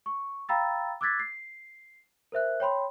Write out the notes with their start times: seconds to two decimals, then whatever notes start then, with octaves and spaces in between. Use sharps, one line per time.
0.06 C#6
0.49 F5 G5 A#5 B5 E6 A6
1.01 D6 E6 F#6 G#6 A6 B6
1.20 C7
2.32 A#4 C5 E5 F#6
2.60 C#5 G5 B5 C6